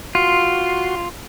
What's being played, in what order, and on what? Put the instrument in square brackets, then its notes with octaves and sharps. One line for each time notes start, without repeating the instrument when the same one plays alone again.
[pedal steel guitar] F4 [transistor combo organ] F#4 C6